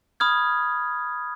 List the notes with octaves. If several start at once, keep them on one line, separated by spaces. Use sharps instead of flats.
B5 D#6 F6 G#6